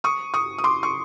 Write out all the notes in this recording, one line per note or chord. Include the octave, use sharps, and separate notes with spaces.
C#6 D#6
C#6 D#6
D#6
C6 D6
C#6